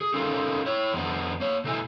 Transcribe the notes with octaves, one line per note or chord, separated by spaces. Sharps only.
G#4
C#4 D#4 F4 A4 A#4
E4 C#5
F2 B3 D4
A#3 C#5
B2 A3 E4 G#5